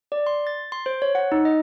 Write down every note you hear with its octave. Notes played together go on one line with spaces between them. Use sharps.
D5
C6
A6
C6
C5
C#5
F#5
D#4
D#5